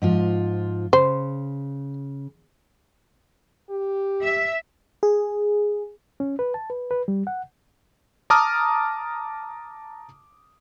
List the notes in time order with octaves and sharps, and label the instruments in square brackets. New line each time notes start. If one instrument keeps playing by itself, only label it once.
[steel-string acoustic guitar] G#2 F3 F4
[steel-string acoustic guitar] C#3 [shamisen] C5
[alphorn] G4
[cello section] E5
[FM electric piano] G#4
[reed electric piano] C#4
B4
A5
B4
B4
G3
F#5
[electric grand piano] A5 A#5 D6 D#6 F6